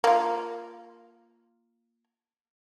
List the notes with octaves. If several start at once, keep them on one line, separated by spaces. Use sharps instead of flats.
A#3 F4